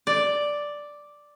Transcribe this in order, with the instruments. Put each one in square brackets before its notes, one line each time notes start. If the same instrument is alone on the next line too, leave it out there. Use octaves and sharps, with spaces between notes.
[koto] D5